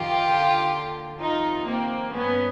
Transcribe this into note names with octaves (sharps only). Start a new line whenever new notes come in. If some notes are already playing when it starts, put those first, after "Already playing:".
Already playing: F2 C3 D#3 F4 G4
D#2 D3
F2 C3 D#3 D#4 F4
A#3 C4
G2 D#3 B3 C#4